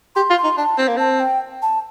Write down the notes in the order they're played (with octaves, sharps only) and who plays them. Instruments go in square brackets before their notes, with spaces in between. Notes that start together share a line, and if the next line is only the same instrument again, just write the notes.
[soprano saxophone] G4 [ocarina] C6
[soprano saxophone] F4
[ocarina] C6
[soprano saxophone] D#4
[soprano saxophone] D4 [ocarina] A5
[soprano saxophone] C4
A#3
[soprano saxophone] C4 [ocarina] A5
[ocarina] G5
A5